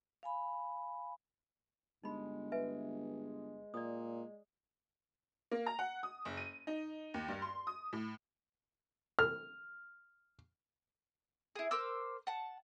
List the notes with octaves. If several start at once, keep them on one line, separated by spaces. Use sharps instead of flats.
F5 G#5 B5
G1 G#3 D#4 B5
B4 E5 G#5
A#2 D5 D#6
A#3
A#5
F#5
D#6
F#1
D#7
D#4
D#2
G2
C6
D#6
A2
F6
E4 G#4
A#4 C5 D6 E6
F#5 A5